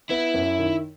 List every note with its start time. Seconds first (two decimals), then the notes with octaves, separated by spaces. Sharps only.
0.10 B3 E4
0.34 F#2
0.59 D#3